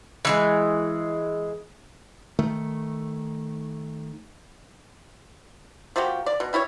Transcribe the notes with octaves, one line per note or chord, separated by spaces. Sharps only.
E3 G3 G#3
D#3 A3
F3 A#3 F#4 G4
D5
B2
G3 E4 C5 C#5